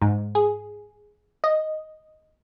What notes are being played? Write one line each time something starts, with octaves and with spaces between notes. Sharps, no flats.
G#2
G#4
D#5